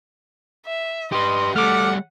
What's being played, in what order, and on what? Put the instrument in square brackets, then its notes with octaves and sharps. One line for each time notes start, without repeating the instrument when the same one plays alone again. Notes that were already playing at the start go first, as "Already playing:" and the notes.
[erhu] E5
[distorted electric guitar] G4 B4 [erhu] D#5 [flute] C6
[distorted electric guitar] G3 A3 [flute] A4 [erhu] F#5 [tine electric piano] D6 F6